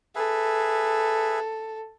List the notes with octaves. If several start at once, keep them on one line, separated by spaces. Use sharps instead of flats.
G#4 A4 B4 E5